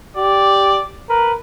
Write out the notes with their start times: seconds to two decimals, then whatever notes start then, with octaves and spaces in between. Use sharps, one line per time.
0.17 G4 D5
1.09 A#4 B4